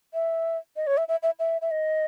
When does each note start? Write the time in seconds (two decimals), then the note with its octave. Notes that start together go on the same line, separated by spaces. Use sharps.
0.14 E5
0.76 D#5
0.87 C#5
0.97 E5
1.08 E5
1.23 E5
1.39 E5
1.61 E5
1.71 D#5